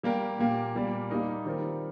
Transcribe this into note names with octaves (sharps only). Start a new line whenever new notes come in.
G3 A#3 G4 A#4
A#2 A#3 G4
A#2 G3 A#3
G3 A#3 D#4 A#4
D#3 G3 C4 F4 A#4